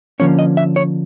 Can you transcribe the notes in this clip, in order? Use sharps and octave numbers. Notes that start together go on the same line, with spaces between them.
D3 F3 A#3 C#4 C#5
D#5
E5
C#5